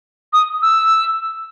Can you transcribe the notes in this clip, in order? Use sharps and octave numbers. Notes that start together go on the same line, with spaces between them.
D#6
E6